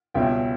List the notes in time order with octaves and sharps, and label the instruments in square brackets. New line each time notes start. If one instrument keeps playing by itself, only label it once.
[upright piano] C#2 B2 G3 C#4 E5 G5